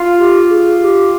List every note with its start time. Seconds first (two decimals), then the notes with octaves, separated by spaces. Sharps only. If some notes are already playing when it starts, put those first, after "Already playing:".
Already playing: F4
0.18 G4
0.49 G#4
0.80 G4